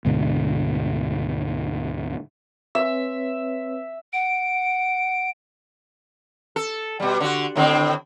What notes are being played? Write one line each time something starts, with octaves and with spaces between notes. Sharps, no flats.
D2 G#2 B2 D3
C4 B4 C#5 E5
F#5 D7
A4
B2 G3
D3 F#4
A2 D3 C4